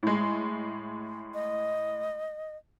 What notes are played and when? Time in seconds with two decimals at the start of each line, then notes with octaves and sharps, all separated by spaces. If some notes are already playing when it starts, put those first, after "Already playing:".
0.03 A2 G#3
1.34 D#5